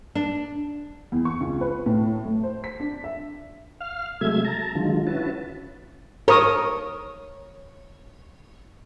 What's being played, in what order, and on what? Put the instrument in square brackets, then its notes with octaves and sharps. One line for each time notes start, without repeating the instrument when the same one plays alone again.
[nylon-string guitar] D4
[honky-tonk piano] E2
C#6
C#2
B4
A2
A3
C5
B6
D4
E5
[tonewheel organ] F5 F6
C3 F#3 G#3 A3 E5 G#6
A5 A#5
D3 D#3 F#3 G#3 F4
C#4 E4 F#4 B4 A5
[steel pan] A#4 D#6 [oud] C#5